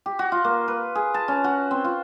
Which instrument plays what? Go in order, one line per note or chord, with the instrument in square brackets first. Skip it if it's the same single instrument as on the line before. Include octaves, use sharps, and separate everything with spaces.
[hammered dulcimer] G4
F#4
F4
A#3
B4
G#4
A5
C#4
F#4
C4
F4